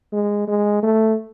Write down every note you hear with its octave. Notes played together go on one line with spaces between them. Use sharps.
G#3
G#3
A3